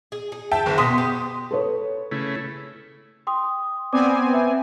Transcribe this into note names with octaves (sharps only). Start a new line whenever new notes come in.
G#4
G#4
E5 G5 A5
F#1
B2 B3 C6 D#6 B6
G4
A4 B4 C#5
C#3 A3 E4
G5 C6 D#6
B3 C4 D5 G#5 D6 D#6
D6
E5